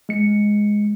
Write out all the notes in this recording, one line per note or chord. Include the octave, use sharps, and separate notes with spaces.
G#3 C#7